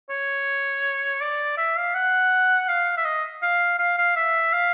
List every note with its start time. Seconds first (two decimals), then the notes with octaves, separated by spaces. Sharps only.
0.10 C#5
1.21 D5
1.58 E5
1.77 F5
1.95 F#5
2.68 F5
2.97 E5
3.05 D#5
3.42 F5
3.79 F5
3.98 F5
4.16 E5
4.53 F5